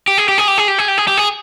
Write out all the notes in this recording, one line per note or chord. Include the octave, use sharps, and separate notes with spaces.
G4
G#4
G4
G#4
G4
G#4
G4
G#4
G4
G#4
G4
G#4